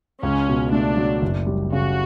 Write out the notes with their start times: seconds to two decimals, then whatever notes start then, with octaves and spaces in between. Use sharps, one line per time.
0.23 C#2 C#4
0.48 B2
0.72 A3 D4
0.97 F#3
1.22 F#1
1.47 G3
1.72 C#3 F#4